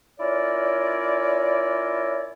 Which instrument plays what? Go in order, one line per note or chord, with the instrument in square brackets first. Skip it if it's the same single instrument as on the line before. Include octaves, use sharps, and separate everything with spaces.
[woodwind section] C#4 E4 F4 A#4 C#5 D5